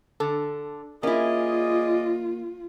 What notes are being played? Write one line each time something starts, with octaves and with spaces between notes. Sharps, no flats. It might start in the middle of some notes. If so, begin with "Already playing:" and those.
D3 A4
A#3 C#4 E4 F4 G#4 D5 D#5